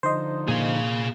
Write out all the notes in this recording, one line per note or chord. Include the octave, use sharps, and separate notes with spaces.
D3 F3 D#4 C5 D#5
A#2 G#4 F5